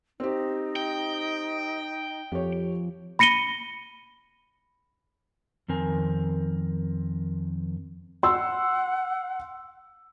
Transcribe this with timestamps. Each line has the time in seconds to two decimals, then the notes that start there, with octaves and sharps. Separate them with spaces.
0.20 C4 D#4 G4
0.76 G5
2.32 F2 G4 C#5
3.19 B5 A#6 C#7 D#7 G7
5.68 F2 D#3 C4 A#4 G#5
8.23 F#5 C6 E6